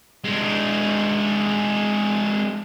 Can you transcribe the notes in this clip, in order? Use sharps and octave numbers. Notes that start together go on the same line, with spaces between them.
G#3 D4